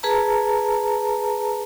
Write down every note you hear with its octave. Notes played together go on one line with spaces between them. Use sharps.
G#4 B4 A5 A#5